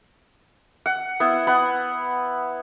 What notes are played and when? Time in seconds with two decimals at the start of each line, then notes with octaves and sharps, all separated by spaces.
0.86 F#5
1.20 B3 E4
1.47 B3 B4 F#5